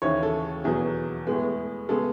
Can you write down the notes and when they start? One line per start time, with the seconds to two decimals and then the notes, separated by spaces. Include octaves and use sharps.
0.02 D#2 C#3 E3 C#5
0.23 A4
0.64 E2 B2 F#3 B3 G#4
1.27 A2 G#3 B3
1.89 C#3 G#3 B3 A4